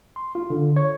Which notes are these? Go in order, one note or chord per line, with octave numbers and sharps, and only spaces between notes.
C6
F4
D3
C#5